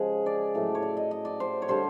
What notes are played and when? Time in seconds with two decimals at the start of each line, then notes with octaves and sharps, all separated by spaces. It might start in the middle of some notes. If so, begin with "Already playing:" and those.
Already playing: C#3 F3 G#3 G#4
0.26 D5
0.55 A2 F#3 A3
0.75 C#5
0.82 D5
0.97 D#5
1.11 D#5
1.25 D5
1.40 C5
1.62 C#5
1.68 D3 G3 C5